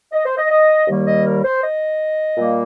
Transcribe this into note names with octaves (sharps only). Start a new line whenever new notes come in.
D#5
C5
D#5
D#5
D#2 D#3 G3 A#3
D#5
A#4
C5
D#5
A#2 G3 A#3